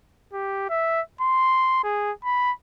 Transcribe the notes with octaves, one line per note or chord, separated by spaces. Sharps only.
G4
E5
C6
G#4
B5